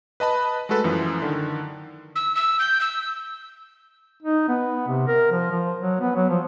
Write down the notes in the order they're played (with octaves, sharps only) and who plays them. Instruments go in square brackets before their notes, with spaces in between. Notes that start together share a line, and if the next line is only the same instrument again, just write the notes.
[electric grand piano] B4 D#5 A5 B5
G#3 A3 F#4 A4 B4
F#2 E3 F3
D3 D#3
[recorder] E6
E6
G6
E6
[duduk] D#4
B3
C3
A#4
F3
F3
F#3
B3
F#3
F3